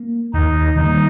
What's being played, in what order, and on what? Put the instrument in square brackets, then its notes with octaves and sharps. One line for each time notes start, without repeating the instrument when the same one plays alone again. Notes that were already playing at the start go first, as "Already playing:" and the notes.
Already playing: [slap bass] A#3
[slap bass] D#2 [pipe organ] D#4
[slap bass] D#3 G3 A#3 [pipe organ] D#4